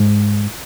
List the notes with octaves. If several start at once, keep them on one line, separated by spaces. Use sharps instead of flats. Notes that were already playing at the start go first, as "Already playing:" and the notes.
Already playing: G#2 G#3